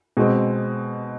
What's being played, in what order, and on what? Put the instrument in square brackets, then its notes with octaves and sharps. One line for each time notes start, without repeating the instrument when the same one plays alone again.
[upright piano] B2 G#3 C4